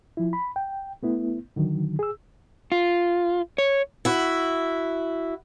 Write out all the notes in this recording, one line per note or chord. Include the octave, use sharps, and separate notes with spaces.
F3 E4
B5
G5
A3 B3 E4
D3 D#3 F#3
G#4 E6
F4
C#5
E4 F#4